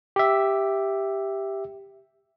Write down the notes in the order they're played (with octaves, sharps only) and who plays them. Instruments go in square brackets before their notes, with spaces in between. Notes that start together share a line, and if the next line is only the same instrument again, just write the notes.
[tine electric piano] G4 E5